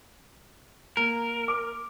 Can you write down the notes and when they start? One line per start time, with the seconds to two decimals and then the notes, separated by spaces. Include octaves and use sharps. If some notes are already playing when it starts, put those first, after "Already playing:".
0.97 A#3 A#4
1.48 D6